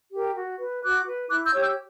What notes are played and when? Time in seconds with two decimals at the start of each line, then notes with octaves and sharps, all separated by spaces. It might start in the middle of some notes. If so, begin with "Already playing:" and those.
0.13 G4 A#4
0.36 F#4
0.59 B4
0.83 F#4 D6 F#6
1.07 B4
1.31 E4 D6 F#6
1.46 E6 G6
1.54 G4 C#5
1.62 E6 G6